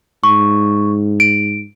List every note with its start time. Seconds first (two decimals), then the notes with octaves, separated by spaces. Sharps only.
0.24 G#2 C#6
1.20 D7